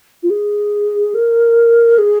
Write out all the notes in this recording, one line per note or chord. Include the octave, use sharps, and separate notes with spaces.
F4
G#4
A#4
G#4